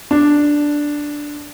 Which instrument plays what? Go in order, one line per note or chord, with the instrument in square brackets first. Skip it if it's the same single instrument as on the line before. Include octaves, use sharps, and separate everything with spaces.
[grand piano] D4